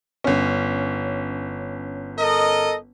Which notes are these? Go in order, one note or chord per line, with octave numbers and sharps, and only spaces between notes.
G1 C#4
A4 A#4 D#5